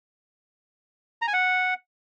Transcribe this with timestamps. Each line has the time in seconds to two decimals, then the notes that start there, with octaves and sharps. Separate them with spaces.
1.22 A#5
1.28 G#5
1.33 F#5